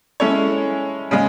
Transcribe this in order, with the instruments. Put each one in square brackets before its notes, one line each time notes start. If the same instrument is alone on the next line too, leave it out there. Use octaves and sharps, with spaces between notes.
[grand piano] G#3 C#4 E4 A4 C#5
C#3 G#3